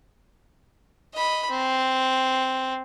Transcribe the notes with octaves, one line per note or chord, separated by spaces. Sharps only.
D#5 B5
C4